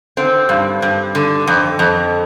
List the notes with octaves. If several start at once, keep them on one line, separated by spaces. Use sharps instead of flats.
D3 C4
G2
G2
D3
F2
F2